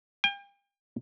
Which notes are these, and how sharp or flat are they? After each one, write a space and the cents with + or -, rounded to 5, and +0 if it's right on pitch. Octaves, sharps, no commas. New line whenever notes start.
G5 +40